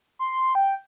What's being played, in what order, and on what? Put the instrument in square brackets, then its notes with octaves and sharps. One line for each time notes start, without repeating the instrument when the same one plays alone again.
[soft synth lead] C6
G5